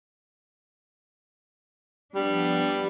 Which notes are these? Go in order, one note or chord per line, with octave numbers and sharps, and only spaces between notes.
F3 G3 B3 D4